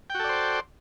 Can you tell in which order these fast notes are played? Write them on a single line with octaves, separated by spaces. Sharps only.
G5 F#4 A4 D5 C5